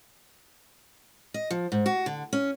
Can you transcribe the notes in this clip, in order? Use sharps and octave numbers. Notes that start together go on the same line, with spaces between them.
D#5
F3
G#2
F#4
D3
C#4